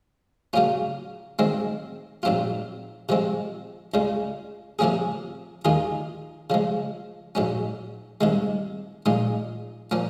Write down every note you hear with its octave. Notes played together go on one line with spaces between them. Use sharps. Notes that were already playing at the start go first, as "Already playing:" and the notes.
C#3 F#3 A#3 C#4 F4
F#2 D#3 G#3 C4
A#1 G#2 F#3 C4 F4
C3 F3 G#3 C4
C#2 C#3 G#3
C3 F3 A#3 C#4 G#4
D#2 D#3 A#3 F4 G#4
C#3 F3 G#3
A#1 G#2 F#3 C#4
C2 C3 D#3 G#3
A#1 A#2 G#3 D#4
A#2 F3 A#3 C#4